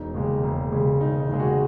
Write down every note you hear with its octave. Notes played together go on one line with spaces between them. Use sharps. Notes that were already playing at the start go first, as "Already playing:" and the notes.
Already playing: E1 D#4
D#2 C#3 G#3
E1
D#2 C#3 G#3
E1 D#4
D#4
D#2 C#3 G#3 G#4
F#4